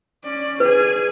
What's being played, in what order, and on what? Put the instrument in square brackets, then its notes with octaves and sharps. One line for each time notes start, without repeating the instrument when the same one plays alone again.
[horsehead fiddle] C#4 D5
[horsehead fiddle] G#4 G#5 [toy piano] B4